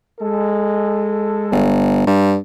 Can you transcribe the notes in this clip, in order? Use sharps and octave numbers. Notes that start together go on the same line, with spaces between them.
G#3 A4
G1
G2